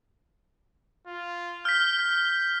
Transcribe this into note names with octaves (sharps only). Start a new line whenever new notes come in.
F4
F6 G6 B6
G6 B6